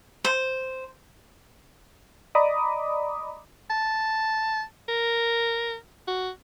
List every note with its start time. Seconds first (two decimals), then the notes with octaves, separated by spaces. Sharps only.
0.25 C5
2.35 D5 D#5 A#5 B5 D6 D#6
3.70 A5
4.88 A#4
6.08 F#4